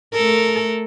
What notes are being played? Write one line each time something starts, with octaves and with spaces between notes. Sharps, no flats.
A3 A4 A#4